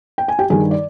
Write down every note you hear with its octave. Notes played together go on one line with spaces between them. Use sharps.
G5
G#5
G4 G5
G2 D#3 G3 G#4 G#5
D5